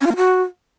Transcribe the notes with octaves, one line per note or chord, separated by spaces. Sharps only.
C#4
F4
A#3
F#4